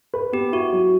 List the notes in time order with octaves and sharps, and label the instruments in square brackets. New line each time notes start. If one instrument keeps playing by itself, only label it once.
[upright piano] B4
[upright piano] B3 [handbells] G4
[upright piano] E4 [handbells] F#4
[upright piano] F#3